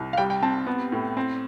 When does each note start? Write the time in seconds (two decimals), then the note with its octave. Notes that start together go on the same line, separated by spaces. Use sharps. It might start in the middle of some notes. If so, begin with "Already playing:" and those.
Already playing: C2
0.13 F5
0.18 G3 G5
0.30 G5
0.42 C4 A5
0.67 B3
0.92 A2
1.17 C4